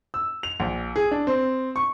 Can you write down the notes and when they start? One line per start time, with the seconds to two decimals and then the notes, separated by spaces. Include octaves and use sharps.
0.14 E6
0.43 F7
0.60 A#1
0.96 G#4
1.11 D4
1.27 C4
1.76 C#6